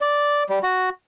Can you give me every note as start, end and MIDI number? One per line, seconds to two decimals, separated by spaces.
0.01 0.44 74
0.49 0.59 55
0.63 0.89 66